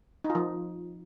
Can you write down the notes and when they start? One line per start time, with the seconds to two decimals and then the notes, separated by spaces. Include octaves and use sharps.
0.24 D#4
0.30 F4
0.35 F3